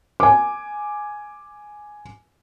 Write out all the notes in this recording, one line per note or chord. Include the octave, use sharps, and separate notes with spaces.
G#5 D6